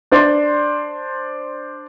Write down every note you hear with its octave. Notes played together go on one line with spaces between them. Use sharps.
D4 C5 D5 C6